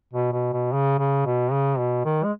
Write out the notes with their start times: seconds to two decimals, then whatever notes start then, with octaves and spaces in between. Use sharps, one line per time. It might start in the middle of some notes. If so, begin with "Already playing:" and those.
0.13 B2
0.32 B2
0.53 B2
0.73 C#3
0.99 C#3
1.26 B2
1.52 C#3
1.78 B2
2.05 D#3
2.24 G#3